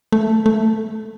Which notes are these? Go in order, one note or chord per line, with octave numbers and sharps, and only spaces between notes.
A3
A3